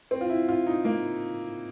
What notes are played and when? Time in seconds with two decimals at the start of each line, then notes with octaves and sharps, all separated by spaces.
0.11 C4
0.21 F4
0.30 E4
0.49 F4
0.67 D#4
0.85 A#3